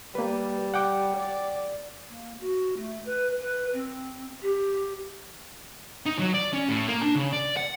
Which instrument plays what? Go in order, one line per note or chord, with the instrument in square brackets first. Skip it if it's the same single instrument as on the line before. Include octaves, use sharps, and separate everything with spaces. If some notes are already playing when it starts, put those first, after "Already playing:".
[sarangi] G3 [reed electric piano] A#3 B4
[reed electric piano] F#5 G5 D6
[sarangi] D5
[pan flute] A#3
F#4
A3
B4
B4
C4
G4
[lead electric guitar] D#4
F#3
D5
C#4
A2
A#3
D4
C#3
D5
F#5